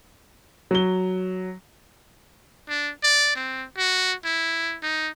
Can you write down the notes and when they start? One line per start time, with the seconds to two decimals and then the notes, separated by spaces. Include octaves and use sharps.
0.71 F#3 G7
2.68 D4
3.03 D5
3.35 C4
3.78 F#4
4.24 E4
4.83 D#4